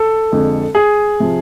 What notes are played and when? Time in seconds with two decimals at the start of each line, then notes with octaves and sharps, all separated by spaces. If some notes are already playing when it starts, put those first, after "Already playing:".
Already playing: A4
0.32 F2 D3 G#3
0.75 G#4
1.20 C3 F3